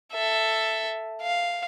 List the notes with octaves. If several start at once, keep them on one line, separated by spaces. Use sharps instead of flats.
A4 E5
F5